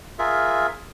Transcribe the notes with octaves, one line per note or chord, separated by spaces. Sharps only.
F4 G#4 A#4 E5